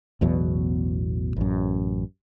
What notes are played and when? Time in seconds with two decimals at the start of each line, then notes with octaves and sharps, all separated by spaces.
0.21 A1 E2 B2 F#3
1.36 A1 F#2